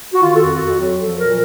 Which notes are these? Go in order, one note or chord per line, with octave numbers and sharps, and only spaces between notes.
F#4
D#3 F4
A4
F2 F#4
F2
F#3
F3 A4
A#2 A#4